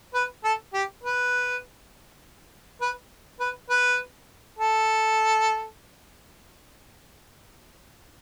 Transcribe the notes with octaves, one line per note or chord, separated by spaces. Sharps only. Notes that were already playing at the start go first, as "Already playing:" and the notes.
B4
A4
G4
B4
B4
B4
B4
A4